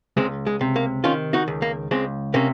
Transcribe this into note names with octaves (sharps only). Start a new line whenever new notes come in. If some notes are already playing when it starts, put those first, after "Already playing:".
C#2 G#3 C4
G#3
C3
A#3
D#3 C#4 F4
D#4 F#4
C#2
A#3
C#2 G#3 C4
C3 A#3 C#4